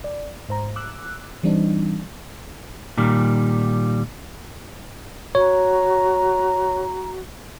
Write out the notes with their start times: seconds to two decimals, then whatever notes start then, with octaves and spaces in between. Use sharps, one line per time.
0.04 D5
0.49 G#2 C5 A#5
0.76 D6 E6 F#6
1.43 E3 G3 C4 D4 D#4
2.98 A#2 D#3 G3
5.35 F#4 C#5 A#5